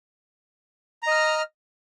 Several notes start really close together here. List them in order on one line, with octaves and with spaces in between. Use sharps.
A#5 D#5 F6